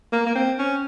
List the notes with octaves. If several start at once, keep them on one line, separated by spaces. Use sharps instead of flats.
A#3
A#3
C4
C#4